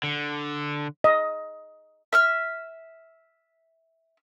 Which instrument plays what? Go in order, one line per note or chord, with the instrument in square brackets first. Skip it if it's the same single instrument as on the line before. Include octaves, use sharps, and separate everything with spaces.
[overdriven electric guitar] D3
[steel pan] D#5
[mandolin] E5 E6 F6